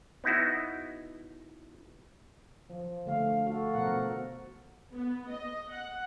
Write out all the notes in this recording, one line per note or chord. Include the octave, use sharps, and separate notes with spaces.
B3 D#4 E4 F#4
F3
D3 A3 F5
F#4 A4 F5
B2 F3 A#4 F#5
B3
D#5
F#5